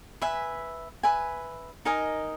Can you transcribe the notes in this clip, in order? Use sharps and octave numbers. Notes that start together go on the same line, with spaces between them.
B4 E5 G#5
B4 E5 G#5
D#4 A#4 D#5 G#5